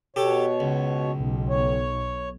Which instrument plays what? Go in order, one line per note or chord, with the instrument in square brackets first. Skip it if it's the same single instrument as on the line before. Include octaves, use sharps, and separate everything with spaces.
[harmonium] B2 C#5 [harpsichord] G4 A4
[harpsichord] C#2
[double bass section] B1
[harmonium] C#5